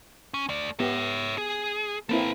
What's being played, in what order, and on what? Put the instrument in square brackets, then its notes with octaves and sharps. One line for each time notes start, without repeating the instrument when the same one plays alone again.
[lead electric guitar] C#4
A3 D5
[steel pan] B3 G4 [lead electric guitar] C#5 E5
[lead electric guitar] G#4
[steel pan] A#3 C4 E4 [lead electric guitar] A4 B4